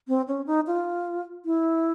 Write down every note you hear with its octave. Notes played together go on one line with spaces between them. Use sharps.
C4
C#4
D#4
F4
E4